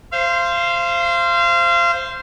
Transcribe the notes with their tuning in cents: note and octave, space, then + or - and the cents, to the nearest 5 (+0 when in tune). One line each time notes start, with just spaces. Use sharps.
C5 +0 F5 -30